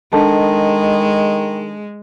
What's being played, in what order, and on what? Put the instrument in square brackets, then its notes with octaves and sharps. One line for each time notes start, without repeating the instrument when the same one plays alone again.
[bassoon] D#3 [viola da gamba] G#3 [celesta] D4 A4 A5